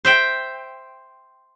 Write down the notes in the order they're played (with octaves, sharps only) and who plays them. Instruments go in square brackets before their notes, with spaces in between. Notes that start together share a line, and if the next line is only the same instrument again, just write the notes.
[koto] C5 E5 G5